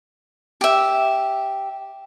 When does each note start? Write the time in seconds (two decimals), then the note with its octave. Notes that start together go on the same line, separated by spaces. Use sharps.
0.61 G4 E5